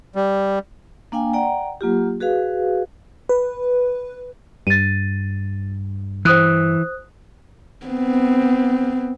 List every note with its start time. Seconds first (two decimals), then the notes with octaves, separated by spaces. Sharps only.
0.16 G3
1.12 A#3 D4 F5 G5 G#5
1.33 D5 F#5 G5 A#5
1.81 F#3 A#3 F4 G4
2.20 F#4 G#4 B4 F5
3.29 B4
4.67 G2 A6 D#7
6.25 E3 C5 D#6 F#6
7.86 B3 C4